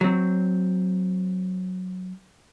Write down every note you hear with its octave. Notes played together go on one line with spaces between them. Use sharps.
F#3 C4